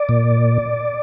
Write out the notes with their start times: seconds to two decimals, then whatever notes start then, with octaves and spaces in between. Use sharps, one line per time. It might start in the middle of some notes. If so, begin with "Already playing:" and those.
Already playing: D5
0.09 A#2